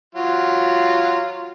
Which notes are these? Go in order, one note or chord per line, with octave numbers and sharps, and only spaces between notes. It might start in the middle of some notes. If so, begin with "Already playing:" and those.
F#3 F4